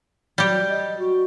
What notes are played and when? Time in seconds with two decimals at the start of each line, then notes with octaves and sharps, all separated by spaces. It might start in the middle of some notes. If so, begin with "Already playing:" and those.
0.38 F#3 G3 G4
0.69 D#5
0.98 F#4